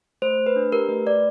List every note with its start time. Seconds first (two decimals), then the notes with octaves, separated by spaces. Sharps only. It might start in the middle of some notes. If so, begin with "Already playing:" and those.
0.22 A3 C5
0.39 A3
0.46 B4
0.56 D4
0.72 G4 A#4
0.89 A3 B4
1.06 A3 D5